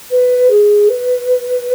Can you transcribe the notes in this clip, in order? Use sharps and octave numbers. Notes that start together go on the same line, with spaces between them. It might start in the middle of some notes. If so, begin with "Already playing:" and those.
B4
G#4
B4